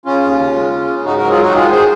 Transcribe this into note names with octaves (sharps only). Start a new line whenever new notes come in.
C#3 C#4 F4
D#2
C#3
G#3
G#3
C#3
G#2 D#4 F#4
F#3 F#4 A#4
F4 G#4
D#3 D#4 F#4
G#3 F4 G#4
G#3 G#4 C5